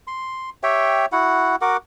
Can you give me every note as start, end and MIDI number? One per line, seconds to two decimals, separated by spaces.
0.07 0.50 84
0.63 1.06 67
0.63 1.06 73
0.63 1.06 76
0.63 1.06 79
1.12 1.56 64
1.12 1.56 66
1.12 1.56 78
1.61 1.77 66
1.61 1.77 70
1.61 1.77 78
1.61 1.77 86